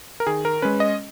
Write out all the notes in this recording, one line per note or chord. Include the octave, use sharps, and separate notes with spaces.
A#4
D#3 G#4
A#4
G#3 C#4 B4
D#5